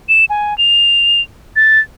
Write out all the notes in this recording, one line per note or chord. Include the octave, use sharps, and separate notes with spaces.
E7
G#5
F7
A6